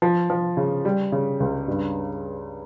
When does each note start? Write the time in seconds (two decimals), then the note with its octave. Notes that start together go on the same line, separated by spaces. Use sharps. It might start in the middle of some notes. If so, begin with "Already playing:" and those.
0.02 F3
0.30 F3
0.57 C#3
0.85 G3
1.12 C#3
1.40 C#2
1.68 G2